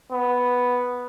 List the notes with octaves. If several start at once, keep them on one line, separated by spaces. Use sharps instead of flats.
B3